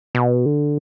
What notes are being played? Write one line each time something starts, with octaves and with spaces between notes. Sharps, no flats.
B2
D3